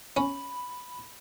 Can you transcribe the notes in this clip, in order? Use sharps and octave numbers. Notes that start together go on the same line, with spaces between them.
C#4 B5